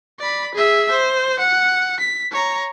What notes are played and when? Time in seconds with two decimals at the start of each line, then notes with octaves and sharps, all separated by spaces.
0.19 D5 B5
0.55 G#4 E5
0.91 C5
1.40 F#5
2.00 B6
2.32 C#5 A#5